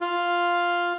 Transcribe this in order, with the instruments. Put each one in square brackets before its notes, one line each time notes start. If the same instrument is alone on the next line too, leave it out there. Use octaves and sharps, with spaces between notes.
[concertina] F4